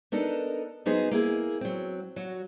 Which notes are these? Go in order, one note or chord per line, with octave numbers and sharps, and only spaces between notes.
B3 D4 D#4 A4 A#4
F#3 B3 D#4 G#4 C5
A#3 E4 G#4
F#3 C4
F#3 F#4